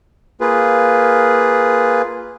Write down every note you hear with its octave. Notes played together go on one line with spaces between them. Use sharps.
A#3 F4 G#4 B4